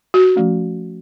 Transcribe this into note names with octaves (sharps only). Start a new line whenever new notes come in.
F#4
F3 A3 C#4